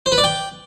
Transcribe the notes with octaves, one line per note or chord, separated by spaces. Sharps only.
C5
B4
D5
G5